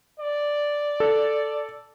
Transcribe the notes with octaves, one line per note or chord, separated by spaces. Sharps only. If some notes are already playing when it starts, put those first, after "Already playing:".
D5
A4